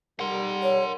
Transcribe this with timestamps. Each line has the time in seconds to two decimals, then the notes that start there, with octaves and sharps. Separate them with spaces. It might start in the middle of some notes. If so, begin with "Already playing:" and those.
0.20 G3 A#4 F#5 C6
0.63 C#5